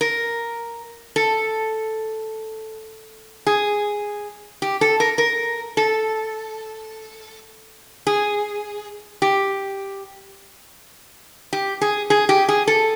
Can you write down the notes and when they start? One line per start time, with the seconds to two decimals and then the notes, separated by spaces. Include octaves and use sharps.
0.01 A#4
1.16 A4
3.47 G#4
4.62 G4
4.81 A4
5.00 A#4
5.18 A#4
5.77 A4
8.07 G#4
9.22 G4
11.53 G4
11.81 G#4
12.10 G#4
12.29 G4
12.49 G#4
12.68 A4